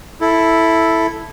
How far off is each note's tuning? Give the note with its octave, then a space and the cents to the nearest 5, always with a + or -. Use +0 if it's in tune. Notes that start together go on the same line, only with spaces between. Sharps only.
E4 +0 A4 +0